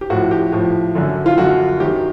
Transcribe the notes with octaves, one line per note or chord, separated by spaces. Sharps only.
G4
A2 F3 F#4
G4
A2 F3
F#2 D3 F#3
F4
F#2 D3 F#3 F#4
F#2 D#3 F#3 G4